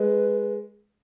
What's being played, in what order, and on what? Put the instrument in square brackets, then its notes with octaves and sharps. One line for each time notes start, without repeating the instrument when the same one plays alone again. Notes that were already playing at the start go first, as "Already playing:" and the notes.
Already playing: [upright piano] G#3 [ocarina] B4